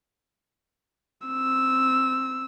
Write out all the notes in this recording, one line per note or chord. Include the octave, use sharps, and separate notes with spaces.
C4 E6